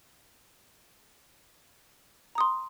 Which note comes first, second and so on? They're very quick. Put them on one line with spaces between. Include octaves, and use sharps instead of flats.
A#5 D#6 C6